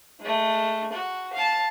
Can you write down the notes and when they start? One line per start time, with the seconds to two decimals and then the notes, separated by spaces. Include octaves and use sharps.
0.20 G#3 A3
0.92 F#4
1.33 F5 A5